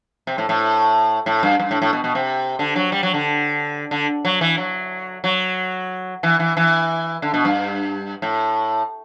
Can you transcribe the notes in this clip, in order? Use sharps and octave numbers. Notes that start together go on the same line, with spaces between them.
C3
A2
A2
A2
G2
G2
A2
A2
B2
B2
C3
D3
F#3
G3
F#3
D3
D3
F#3
E3
F#3
F#3
E3
E3
E3
D3
B2
G2
A2